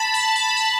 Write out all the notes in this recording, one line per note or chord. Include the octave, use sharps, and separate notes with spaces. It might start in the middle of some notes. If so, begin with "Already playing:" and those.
Already playing: A5 B5
A5
B5
A5